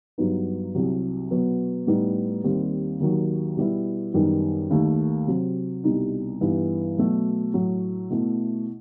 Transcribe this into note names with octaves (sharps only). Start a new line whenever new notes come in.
G2 F#3 B3 D#4
C2 C3 F#3
B2 F#3 B3
A2 G3 B3 D#4
D#2 D#3 G3 C4
D#2 D#3 F#3
B2 G3 B3 E4
F#2 D#3 G3 B3 D#4
D#2 D#3 A3
C3 F#3 C4
C2 B2 G3 D#4
G2 E3 B3 D#4
B2 F#3 A3
A2 F#3 A3
B2 A3 E4